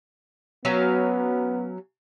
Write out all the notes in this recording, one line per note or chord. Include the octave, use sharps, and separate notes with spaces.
F#3 B3 C#4 F5